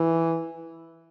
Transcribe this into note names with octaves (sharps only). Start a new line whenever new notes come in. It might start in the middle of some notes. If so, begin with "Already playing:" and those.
Already playing: E3